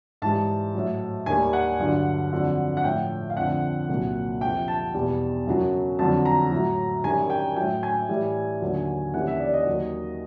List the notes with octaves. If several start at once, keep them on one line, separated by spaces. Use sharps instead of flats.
G#2 E3 G3 A5
A2 F#3
D#2 D#3 G3 G#5
F#5
G2 D3 F#3
F2 D3 F#3
F#5
A2 F3 G5
F5
F2 D3 F3 F#5
C2 A#2 F#3
F2 C3 F3 G5
A5
E2 B2 G3
F#2 C#3 F#3
F2 D3 F#3 A5
A#5
A2 F#3
F#2 D#3 G3 G#5
G5
A2 F#3 G5
G#5
A2 E3 G3
D#2 D3 F#3
D#2 C#3 E3 G3 F#5
E5
D5
D#5
D#2 D#3 F#3